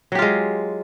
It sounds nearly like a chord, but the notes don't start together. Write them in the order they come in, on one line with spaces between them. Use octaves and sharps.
F#3 G4 F4 G#3